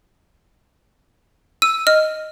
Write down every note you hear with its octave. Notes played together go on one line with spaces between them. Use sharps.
E6 D#7
D#5 F6